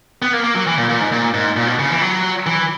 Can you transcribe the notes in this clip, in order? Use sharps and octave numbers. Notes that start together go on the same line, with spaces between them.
B3
A#3
A#3
F#3
E3
A#2
A#2
G#2
A#2
G#2
A#2
B2
C#3
E3
F#3
E3